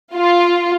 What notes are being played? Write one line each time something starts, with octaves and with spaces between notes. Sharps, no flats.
F4